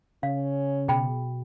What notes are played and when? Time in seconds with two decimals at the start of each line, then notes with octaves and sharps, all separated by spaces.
0.23 C#3 C#4 F5
0.88 B2 G#4 G5 B5